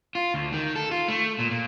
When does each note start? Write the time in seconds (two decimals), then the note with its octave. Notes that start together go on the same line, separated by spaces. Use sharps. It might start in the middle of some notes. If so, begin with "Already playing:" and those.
0.15 F4
0.34 D2
0.53 D#3
0.76 A4
0.91 F4
1.08 A3
1.39 A#2
1.51 A#2